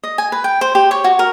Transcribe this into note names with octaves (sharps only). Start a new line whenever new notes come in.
D#5
G#5
B4
G5
C5
G4
C#5
F#4
A#4